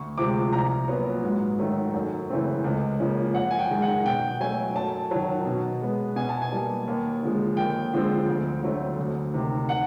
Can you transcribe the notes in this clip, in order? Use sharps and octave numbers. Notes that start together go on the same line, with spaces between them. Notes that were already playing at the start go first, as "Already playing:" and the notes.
Already playing: D2 C#6
C3 F3 G#3 C4 D6
C2 A#5
A#2 F#3 B3
G#2
D#3 F#3 A3
F#2
C#3 E3 A3 C4
C#2
C#3 F3 A#3
F#2 F#5
G#5
G5
D#3 G#3
F#5
B2 G5
F#3 A3 G#5
F#2 A5
D#3 F#3
B2
G#3 B3
B2 G#5
A5
G#5
G3 A#3
D#2
D3 F3 G#3
D#2 G5
D3 F3 G#3 C4
D2
D3 F#3 A3 C4
D2
C3 D#3
F#5